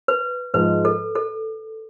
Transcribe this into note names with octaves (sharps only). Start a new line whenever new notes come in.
B4
G#2 F3 G#3 B4
A4
A4